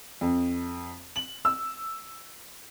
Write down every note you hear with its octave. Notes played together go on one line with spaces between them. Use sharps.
F2
F#7
E6